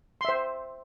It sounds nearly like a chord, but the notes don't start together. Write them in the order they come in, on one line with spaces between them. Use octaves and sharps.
C6 E5 C5